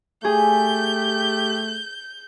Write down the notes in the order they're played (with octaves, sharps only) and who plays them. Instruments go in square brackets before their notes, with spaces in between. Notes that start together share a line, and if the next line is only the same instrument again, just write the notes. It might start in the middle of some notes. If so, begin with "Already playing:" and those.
[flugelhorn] A3 [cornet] G4 [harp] G#4 [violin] G6